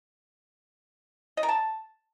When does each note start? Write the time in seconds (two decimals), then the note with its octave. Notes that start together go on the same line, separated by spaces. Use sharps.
1.37 D#5
1.43 A#4
1.49 A5